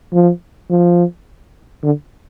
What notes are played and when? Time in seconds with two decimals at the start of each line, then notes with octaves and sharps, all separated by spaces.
0.13 F3
0.70 F3
1.83 D3